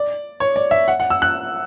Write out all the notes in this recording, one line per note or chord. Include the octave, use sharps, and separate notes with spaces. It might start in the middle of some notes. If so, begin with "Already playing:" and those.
Already playing: D5
C#5
D5
E5
F#5
F#5
E6
F#6